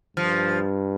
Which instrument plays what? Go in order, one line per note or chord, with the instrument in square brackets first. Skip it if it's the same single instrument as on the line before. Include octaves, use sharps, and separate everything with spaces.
[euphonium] G2 [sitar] F3